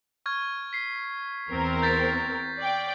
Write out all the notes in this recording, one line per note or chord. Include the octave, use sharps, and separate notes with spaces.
C#6 F6 G#6
B6 C7
E2 C4 A#4
G6 A6 B6
D5 G5